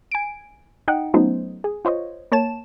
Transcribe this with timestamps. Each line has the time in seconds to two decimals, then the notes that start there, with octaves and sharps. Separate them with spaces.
0.12 G#5 D7
0.88 D#4 D#5 F#5 G5
1.14 F#3 A3 B3 C#4 D#4 C5
1.64 G#4
1.85 F4 C5 C#5 D#5
2.32 A#3 C#5 A5 E7